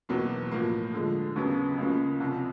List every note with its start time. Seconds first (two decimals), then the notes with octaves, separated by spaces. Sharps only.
0.09 E2 B2 F#3 A#3
0.51 A2 F3 A#3
0.94 D3 F3 G#3
1.36 D#2 C#3 F#3 B3
1.78 C#2 C#3 F#3 A#3
2.20 C2 C3 F3